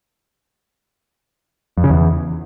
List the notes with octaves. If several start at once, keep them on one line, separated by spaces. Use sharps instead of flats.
F2
C#3
E2